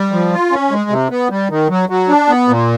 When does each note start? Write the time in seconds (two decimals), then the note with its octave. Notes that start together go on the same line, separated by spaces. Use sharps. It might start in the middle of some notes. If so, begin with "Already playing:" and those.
Already playing: G3
0.12 F3
0.32 F4
0.51 C#4
0.71 G#3
0.90 C3
1.10 B3
1.30 G3
1.50 D#3
1.70 F#3
1.89 F#3
2.09 D4
2.29 B3
2.48 A#2